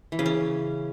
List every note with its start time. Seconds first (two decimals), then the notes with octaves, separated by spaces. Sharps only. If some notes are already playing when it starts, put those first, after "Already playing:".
0.12 E3
0.19 C#3
0.26 C#4